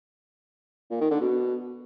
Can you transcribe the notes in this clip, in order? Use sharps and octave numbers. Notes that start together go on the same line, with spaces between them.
A#2
D#3
D3
B2